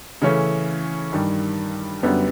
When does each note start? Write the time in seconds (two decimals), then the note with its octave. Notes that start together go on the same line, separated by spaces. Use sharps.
0.22 C#3 E3 A3 C#4
1.12 G2 D#3 G3
2.03 F#2 D3 G3 B3